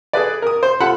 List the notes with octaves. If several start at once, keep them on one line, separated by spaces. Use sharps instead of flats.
G#4 A4 B4 D5
A#4 D#6
C5
F4 A4 F#5 B5